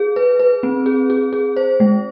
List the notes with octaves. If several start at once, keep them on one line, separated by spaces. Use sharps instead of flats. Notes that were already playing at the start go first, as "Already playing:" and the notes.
Already playing: G#4
B4
B4
C4
G#4
G#4
G#4
C5
G#3